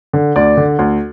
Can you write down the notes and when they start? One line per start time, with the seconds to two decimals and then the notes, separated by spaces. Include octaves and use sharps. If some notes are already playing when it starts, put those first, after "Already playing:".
0.13 D3
0.36 D2 D5
0.57 D3
0.79 D2